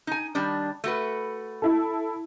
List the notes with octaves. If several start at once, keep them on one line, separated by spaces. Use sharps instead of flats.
D#4 G#5
D#3 G3 D4
A3 F#4 B4
E4 A4